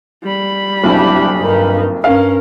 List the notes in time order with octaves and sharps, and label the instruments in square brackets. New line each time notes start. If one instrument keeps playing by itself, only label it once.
[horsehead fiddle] G3 B5
[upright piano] F#1 B1 F2 [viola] D4 G4 [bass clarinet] E4
[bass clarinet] G2 [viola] D#3 D#4
[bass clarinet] G2 [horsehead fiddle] C#4 [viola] A#4 [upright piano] F5